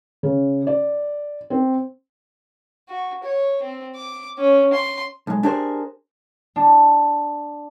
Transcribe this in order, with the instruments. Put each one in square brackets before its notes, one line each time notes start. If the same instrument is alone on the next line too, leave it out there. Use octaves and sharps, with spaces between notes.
[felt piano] C#3
D5
C4
[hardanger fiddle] F#4
C#5
C4
D6
C#4
C6
[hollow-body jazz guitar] B1 G#3
D4 G4 G#4 A#4 C5
[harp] D4